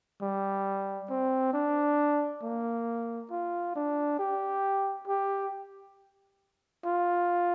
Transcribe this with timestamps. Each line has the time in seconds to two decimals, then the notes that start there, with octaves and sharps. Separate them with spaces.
0.21 G3
1.10 C4
1.53 D4
2.42 A#3
3.31 F4
3.76 D4
4.19 G4
5.08 G4
6.85 F4